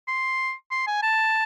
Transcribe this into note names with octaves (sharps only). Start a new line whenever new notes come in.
C6
C6
G#5
A5